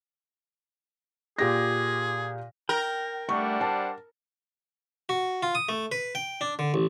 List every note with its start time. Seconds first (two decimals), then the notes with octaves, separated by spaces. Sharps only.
1.38 A#2 G4 G#4 A#6
2.69 A#4 G5
3.29 G3 A3 D4 F#5 C#6
3.61 C5 A5
5.09 F#4
5.43 F4
5.55 D#6
5.69 A3
5.92 B4
6.15 G5
6.41 D4
6.59 D3
6.74 A1